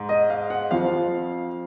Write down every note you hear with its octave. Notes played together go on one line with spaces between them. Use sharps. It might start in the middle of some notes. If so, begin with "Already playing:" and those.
Already playing: G#2
D#5
F5
F#5
F2 F3 F5